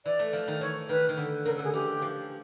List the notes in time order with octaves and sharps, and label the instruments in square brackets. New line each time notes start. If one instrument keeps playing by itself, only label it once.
[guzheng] E3 [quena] D5
[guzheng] A3
F3
D#3
[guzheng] E3 [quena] C#5
[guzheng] D#3 [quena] B4
[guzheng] D#3
D3
[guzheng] C#3 [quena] A#4
[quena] A4
[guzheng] D3
[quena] G#4
[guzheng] E3 [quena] G4
[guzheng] F3